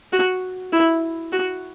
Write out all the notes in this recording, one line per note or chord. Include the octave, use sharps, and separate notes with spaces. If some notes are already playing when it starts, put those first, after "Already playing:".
F#4
E4
F#4